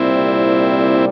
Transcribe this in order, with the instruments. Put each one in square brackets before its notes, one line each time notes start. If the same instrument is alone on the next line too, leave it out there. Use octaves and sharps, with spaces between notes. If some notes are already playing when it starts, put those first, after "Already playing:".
Already playing: [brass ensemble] C2 A#2 G3 [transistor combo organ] C4 E4